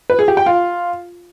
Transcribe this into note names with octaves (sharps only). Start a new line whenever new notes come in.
B4
G#4
G4
G5
F4